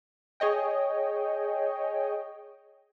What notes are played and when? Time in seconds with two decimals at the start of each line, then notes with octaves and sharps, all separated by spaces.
0.40 G#4 C#5 D#5 G5